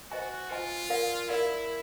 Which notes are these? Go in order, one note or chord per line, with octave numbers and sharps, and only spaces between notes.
F#4 C5 D#5 G#5
F4 C5 D#5 G#5
A#4 D5 F5
E4 A#4 D5 F5